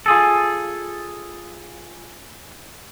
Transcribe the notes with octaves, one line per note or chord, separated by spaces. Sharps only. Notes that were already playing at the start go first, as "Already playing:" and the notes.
F4 G#4 A4